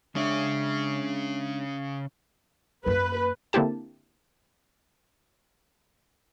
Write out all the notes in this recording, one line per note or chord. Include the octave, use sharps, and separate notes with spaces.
C#3 G#3 C#4 D4 E5
F#2 A#3 B4
D3 A#3 C4 E4 G4 A5